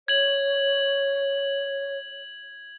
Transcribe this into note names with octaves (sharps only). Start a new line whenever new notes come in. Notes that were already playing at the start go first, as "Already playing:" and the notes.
C#5 G#6 F#7